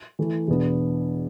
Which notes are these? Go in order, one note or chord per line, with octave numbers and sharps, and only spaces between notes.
E3 A3 E4
E2 B2 B3 D4